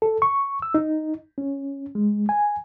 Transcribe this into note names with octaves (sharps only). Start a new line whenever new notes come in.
A4
C#6
E6
D#4
C#4
G#3
G#5